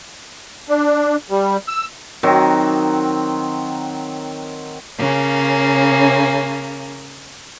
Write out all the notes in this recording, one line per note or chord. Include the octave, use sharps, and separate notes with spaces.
D4
G3
E6
D#3 F#3 C4
C#3 A#3 C#4